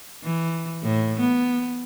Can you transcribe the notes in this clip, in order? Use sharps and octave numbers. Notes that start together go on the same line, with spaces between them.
E3
A2
B3